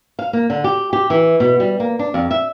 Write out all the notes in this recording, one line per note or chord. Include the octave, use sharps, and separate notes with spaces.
F5
A#3
D3
G4
G4
E3
B2
G3
A#3
D4
F2
E5